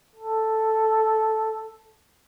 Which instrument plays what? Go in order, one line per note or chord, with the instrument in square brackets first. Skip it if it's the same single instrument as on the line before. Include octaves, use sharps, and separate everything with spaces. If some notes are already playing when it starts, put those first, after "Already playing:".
[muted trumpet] A4